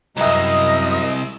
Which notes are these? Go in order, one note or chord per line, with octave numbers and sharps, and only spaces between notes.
C2 F#2 F#3 A#4 D#5 E5 A#5